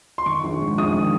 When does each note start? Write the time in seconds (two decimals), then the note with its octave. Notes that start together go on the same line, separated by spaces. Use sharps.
0.18 C6
0.26 D#3 C#6
0.44 A#1
0.61 G#2
0.78 A#1 D#6
0.95 D#3